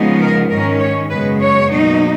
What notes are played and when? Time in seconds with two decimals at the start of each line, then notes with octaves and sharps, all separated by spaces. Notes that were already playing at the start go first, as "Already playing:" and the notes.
Already playing: C#3 F3 G#3 B3 D#4
0.21 A#4
0.50 G#2 D#3 G#3 C#4 A#4
0.80 C#5
1.10 F#2 C#3 G#3 B3 B4
1.40 C#5
1.70 B2 F#3 A#3 D#4